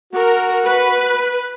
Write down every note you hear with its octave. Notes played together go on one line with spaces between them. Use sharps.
F#4 A#4
B4